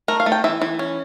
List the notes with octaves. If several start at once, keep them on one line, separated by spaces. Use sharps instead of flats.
A3 A#4
F5
A3
G5
E3 E5
E3
C#4